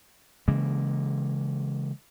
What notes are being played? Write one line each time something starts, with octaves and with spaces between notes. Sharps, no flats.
C#3 E3 G#3 A#3